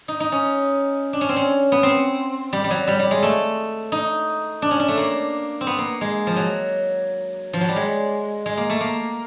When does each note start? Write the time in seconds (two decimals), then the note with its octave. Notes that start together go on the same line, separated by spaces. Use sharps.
0.08 D#4
0.20 D#4
0.32 C#4
1.13 D4
1.21 C#4
1.29 C4
1.36 C#4
1.72 B3
1.83 C4
2.53 G3
2.64 G3
2.70 F#3
2.88 G3
2.99 G3
3.11 G#3
3.23 A3
3.92 D#4
4.62 D4
4.71 C#4
4.80 D4
4.88 A3
4.97 A#3
5.61 C4
5.67 B3
5.78 A#3
6.01 G#3
6.27 F3
6.36 F#3
7.53 F3
7.61 F#3
7.69 G3
7.76 G#3
8.46 G#3
8.57 A#3
8.70 A3
8.81 A#3